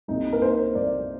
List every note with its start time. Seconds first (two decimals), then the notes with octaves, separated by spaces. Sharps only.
0.08 C2 A#2 A3 D#4
0.33 A#4
0.42 C5
0.75 C2 A#2 A3 D5